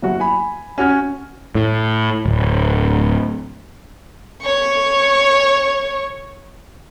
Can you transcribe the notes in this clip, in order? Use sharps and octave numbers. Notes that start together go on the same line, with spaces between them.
F#1 F#4
G#5 B5
C#4 F#4 F6 G#6
A2
D1
C#5 C#6